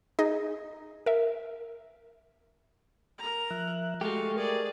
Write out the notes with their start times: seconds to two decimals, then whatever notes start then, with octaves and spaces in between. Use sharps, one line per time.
0.19 D#4 G#4 D#5
1.06 A#4 E5
3.18 A#4 A#5
3.50 F3 E5 F#6
4.01 G#3 A3 F#4 G4 A4 F5 C#6
4.36 G#4 A#4 D5